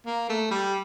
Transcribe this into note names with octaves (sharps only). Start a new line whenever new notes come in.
A#3
A3
G3